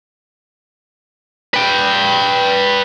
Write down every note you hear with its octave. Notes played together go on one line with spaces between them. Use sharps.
B4 G5